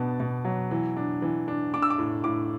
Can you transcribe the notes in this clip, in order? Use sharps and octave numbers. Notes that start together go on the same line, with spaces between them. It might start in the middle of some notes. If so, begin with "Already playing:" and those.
Already playing: B2 B3 D4 A5
B2
F#3
E3
D4
E3
D4
D4 D6
E6
D6
A2
A2 D6